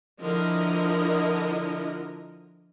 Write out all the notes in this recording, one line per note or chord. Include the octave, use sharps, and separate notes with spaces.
D3 F3 E4 A#4 D#5